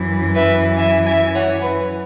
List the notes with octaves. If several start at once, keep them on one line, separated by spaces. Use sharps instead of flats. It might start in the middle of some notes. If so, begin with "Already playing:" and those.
Already playing: F#2 E3
B4 E5
E5 G#5
E5 G#5
C#5 F#5
B4